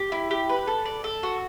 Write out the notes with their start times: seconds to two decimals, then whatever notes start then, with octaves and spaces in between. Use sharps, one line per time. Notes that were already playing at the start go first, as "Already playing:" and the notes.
Already playing: G4
0.12 E4
0.31 G4
0.49 B4
0.67 A4
0.85 D5
1.04 A4
1.23 F#4